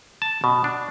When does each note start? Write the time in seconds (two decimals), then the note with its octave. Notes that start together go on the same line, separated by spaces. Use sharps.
0.22 A5
0.44 B2
0.64 D4